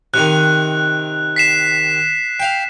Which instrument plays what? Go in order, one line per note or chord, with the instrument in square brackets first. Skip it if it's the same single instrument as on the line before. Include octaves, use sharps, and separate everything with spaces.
[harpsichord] C3 D#3 [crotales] F#6
[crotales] B6 C7 E7
[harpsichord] F5 G5